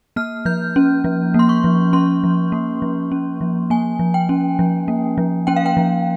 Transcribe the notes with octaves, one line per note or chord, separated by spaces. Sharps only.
A#3 F6
F3 G6
C#4
F3
A#3
C6
C#6
F3
C#4 C6
F3
A#3
F3
C#4
F3
A#3 G#5
F3
G5
C#4
F3
A#3
F3
C#4 G5
F5
G5
F3